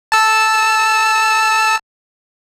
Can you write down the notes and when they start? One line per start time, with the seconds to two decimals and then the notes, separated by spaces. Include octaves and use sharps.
0.12 A5 E6